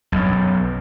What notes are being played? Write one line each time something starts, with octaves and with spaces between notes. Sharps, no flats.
B1 F#2